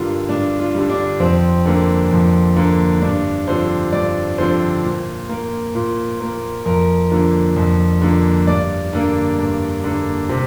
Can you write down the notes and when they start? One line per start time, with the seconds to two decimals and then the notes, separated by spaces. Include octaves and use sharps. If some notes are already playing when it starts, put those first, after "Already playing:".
Already playing: G2 D3 G3 F4 A#4
0.29 G2 D4
0.59 F4
0.75 D3 G3
0.90 D4
1.20 F2 C4
1.65 D3 A#3
2.11 F2
2.56 D3 A#3
3.02 G2 D4
3.47 D3 F3 C4 C5
3.92 G2 D5
4.38 D3 F3 C4 C5
4.84 A#2
5.29 A#3
5.75 A#2
6.20 A#3
6.66 F2 A#4
7.12 D3 F3 A#3
7.56 F2
8.02 D3 F3 A#3
8.47 G2 D5
8.93 D3 A#3
9.38 G2
9.84 D3 A#3
10.29 C3